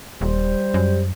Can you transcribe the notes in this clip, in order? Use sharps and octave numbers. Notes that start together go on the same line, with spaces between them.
D#1 G3 C5
F#2